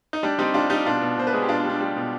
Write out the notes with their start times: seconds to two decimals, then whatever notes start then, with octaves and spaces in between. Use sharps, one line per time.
0.13 D#4
0.23 G3 D4
0.39 G3 C4 D#4
0.54 G3 D4 F4
0.70 G3 D#4 G4
0.86 B2 D4 F4
1.01 B2
1.17 B2 C5
1.27 B4
1.33 G#3 G#4
1.42 G4
1.49 B2 D4 F4
1.59 D4
1.64 G3
1.70 D4
1.81 G3
1.96 B2